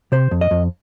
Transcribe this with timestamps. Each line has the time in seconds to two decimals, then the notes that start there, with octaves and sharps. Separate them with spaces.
0.12 C3 C5
0.31 F2
0.41 D#5
0.51 F2